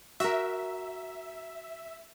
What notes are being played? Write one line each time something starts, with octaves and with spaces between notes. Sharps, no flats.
F#4 A#4 E5